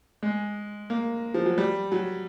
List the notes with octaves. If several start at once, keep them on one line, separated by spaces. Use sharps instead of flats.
G#3
A#3
F3
F#3
G3
F#3